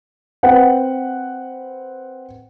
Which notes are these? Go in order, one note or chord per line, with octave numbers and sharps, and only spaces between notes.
C4 B4 F#5 G5